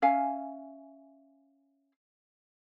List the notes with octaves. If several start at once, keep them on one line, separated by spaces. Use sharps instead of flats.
C#4 E5 F5 G#5